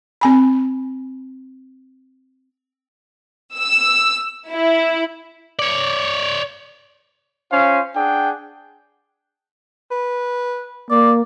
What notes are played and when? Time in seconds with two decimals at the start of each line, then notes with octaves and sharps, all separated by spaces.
0.21 C4 G#5 B5
3.56 E6
4.51 E4
5.59 C#5 D5
7.52 C#4 F4 C5 F5
7.96 D4 G#4 F#5 G5
9.91 B4
10.90 A#3 D5